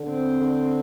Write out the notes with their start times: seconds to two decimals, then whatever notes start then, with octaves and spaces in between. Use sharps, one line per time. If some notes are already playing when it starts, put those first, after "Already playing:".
Already playing: D3
0.09 C4
0.41 D3